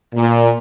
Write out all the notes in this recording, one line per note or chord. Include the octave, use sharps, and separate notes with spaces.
A#2